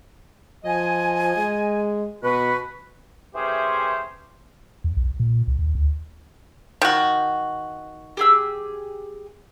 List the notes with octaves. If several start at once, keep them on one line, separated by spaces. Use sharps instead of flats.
F3 D#5 G#5
G#3
B2 F#4 B4
E3 A3 C#4 G4 G#4 C5
E2
B1
A#2
C2
D#2
D2
D#3 F#4
G4 G#4 E6